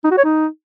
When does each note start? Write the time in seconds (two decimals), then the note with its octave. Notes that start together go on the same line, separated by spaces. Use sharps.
0.04 D#4
0.11 F#4
0.18 C#5
0.25 D#4